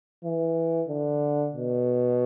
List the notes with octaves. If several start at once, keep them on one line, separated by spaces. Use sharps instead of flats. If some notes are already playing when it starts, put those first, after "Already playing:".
E3
D3
B2